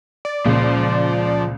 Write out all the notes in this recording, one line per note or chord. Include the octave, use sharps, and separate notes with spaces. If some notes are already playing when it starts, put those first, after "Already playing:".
D5
C#2 A#2 F3 C5